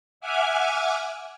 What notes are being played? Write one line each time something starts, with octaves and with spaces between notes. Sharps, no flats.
E5 F#5 G#5 D6 F6 G#6